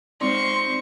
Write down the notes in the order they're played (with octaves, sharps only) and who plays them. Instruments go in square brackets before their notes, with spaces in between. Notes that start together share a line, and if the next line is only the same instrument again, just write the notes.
[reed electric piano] G#3 C4 D5 [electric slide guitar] D#4 F4 [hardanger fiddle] C5 C#6 [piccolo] C6